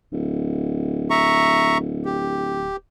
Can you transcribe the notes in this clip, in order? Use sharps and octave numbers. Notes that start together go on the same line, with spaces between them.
D1
E5 A#5 C#6
G4